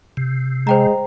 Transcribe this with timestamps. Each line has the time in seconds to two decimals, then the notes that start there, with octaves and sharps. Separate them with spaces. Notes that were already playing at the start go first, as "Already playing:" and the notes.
0.17 C3
0.67 G#3 C5 G5 A#5